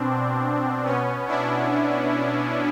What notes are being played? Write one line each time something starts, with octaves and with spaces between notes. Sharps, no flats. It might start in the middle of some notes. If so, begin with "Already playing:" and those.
Already playing: B2 C4 D4
B2 B3 C#4
D4 E4